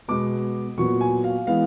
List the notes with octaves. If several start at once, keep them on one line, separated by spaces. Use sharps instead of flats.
B2 G#3 B3 D6
A#2 F#3 B3 C#6
G#5
F5
E3 G#3 B3 F5